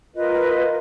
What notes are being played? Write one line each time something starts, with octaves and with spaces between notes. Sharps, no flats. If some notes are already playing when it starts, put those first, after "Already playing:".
F4 A#4 B4 D#5